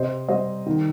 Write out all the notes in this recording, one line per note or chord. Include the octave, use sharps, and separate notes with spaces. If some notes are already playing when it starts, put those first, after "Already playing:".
Already playing: C3 C5 D#5
G3 C5 D#5
D#3